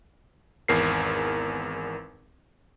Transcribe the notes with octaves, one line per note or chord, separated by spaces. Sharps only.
G#1 E2 A#4 C7